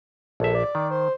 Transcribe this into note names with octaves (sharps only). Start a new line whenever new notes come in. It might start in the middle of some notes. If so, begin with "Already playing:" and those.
A#1 A4 E5
D5
D#3
C5